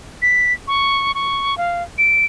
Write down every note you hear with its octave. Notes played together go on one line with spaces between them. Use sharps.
B6
C#6
C#6
F5
D7